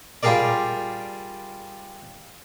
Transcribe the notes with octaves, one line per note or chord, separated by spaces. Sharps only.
G3 F4 G4 G#4 A#4 D5